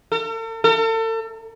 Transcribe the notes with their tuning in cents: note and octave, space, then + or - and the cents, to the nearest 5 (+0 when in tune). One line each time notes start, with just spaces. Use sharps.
A4 +45
A4 +40